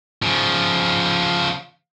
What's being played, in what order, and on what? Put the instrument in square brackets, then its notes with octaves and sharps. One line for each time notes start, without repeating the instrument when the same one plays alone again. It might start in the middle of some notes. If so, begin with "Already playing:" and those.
[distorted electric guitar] C#3 F3